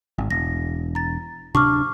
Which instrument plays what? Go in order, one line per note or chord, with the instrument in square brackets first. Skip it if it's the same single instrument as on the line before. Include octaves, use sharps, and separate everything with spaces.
[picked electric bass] G#1
[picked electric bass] E1 [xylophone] A#6
[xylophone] A#5 A6
[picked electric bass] D1 C3 D4 [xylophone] C#6 D6 F6